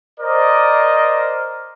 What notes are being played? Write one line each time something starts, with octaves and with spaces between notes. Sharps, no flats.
A#4 C5 D5 D#5